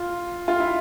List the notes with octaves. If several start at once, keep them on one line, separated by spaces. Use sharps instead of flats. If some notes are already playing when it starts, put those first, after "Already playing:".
Already playing: F4
F4
E4